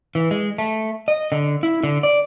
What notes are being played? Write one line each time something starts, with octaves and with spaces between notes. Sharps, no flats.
E3
G#3
A3
D#5
D3
E4
D3
D5